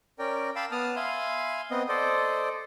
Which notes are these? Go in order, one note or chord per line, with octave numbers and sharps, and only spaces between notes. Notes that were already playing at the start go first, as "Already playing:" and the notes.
C#4 A#4 D5 G5
F5 G5 A5 B5 D6 E6
B3 A5 D#6 F6
E5 F5 G#5 B5 C6
B3 C4 D#5
A4 C5 D5 D#5